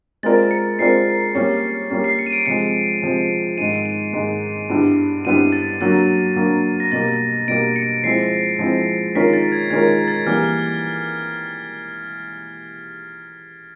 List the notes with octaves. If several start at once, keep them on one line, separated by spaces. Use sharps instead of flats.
G#3 C4 F4 A#4 D5 A6
C#7
G#3 C4 F4 A#4 D5 C7
G3 A#3 C#4
G3 A#3 C#4
C7
C#7
D#7
D7
C3 F3 G#3 C#7
C3 F3 G#3
G#2 D#3 G#3 D#7
D#7
G#2 D#3 G#3
G2 D3 G3 B3 E4
G2 D3 G3 B3 E4 D#7
A6
D3 F#3 A#3 A6
D3 F#3 A#3
A#6
B2 G3 A#3 A6
B2 G3 A#3 D7
C#7
F3 G#3 C4 E4 C7
F3 G#3 C4 E4
D#3 G#3 C#4 F4 A#4 B6
A6
G#6
D#3 G#3 C#4 F4 A#4 G#6
G#6
A6
E3 G3 A#3 F6